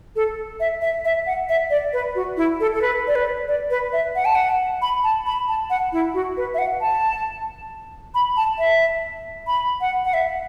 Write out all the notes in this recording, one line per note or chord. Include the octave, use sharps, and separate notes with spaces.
A4
E5
E5
E5
F#5
E5
D5
B4
F#4
E4
A4
A4
B4
D5
B4
D5
B4
E5
F#5
A5
F#5
B5
A5
B5
A5
F#5
E4
F#4
B4
E5
F#5
A5
B5
A5
E5
B5
F#5
F#5
E5